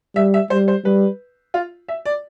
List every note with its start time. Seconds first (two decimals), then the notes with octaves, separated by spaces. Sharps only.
0.16 G3 E5
0.34 E5
0.50 G3 C5
0.68 C5
0.85 G3 B4
1.54 F4
1.88 E5
2.06 D5